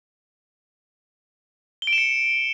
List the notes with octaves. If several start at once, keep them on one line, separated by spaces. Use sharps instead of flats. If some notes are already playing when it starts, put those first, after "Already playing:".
G7
D7
E7
C#7